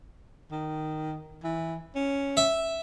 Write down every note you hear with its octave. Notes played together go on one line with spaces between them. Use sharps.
D#3
E3
C#4
E5